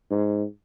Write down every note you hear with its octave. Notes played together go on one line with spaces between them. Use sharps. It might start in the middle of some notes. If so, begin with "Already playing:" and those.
G#2